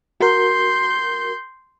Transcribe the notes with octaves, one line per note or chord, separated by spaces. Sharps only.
F#4 A#4 C6 G6